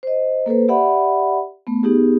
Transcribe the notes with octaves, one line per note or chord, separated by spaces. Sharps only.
C5 D#5
A#3 A4 B4 C5
G4 D5 E5 F#5 B5
A3 B3
B3 D#4 G4 G#4